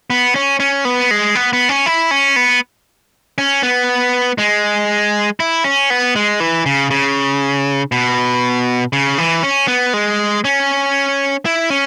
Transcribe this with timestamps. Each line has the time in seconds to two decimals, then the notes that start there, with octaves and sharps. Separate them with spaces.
0.10 B3
0.35 C#4
0.60 C#4
0.85 B3
1.11 G#3
1.35 B3
1.53 B3
1.69 C#4
1.86 E4
2.11 C#4
2.36 B3
3.38 C#4
3.63 B3
4.38 G#3
5.40 E4
5.64 C#4
5.90 B3
6.16 G#3
6.40 E3
6.66 C#3
6.90 C#3
7.92 B2
8.93 C#3
9.18 E3
9.43 C#4
9.68 B3
9.93 G#3
10.45 C#4
11.45 E4
11.70 C#4